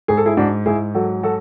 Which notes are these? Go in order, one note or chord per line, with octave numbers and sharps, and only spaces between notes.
G#2 G#4
A4
E4 G#4
G#2 D4 F#4
G#2 E4 G#4
F#3 F#4 A4
F#3 F#4 A4